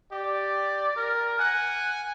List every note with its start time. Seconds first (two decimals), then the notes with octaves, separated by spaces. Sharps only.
0.12 G4 D5
0.97 A#4
1.39 F#5 G#5